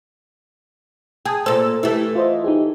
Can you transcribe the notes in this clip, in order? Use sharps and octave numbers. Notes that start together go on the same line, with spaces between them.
G#4 G5 A5 D#6
A#2 A4 C5
E3 A3 E4 G4 A4
F4 C5 D#5
D#4 G4 G#4